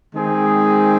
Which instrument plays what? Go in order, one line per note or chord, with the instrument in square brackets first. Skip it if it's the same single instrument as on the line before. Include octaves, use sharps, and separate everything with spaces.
[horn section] D#3 G#3 C4 G#4